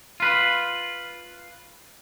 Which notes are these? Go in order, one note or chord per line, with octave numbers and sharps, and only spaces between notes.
F4 B4